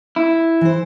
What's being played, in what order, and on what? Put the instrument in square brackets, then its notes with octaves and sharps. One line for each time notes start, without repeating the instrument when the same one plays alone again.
[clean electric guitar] E4
[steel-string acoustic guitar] E3 C5